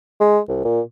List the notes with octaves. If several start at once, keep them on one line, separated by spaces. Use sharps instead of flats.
G#3
C2
A#2